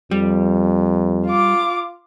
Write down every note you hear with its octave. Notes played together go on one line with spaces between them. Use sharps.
F2 G3
F4 D6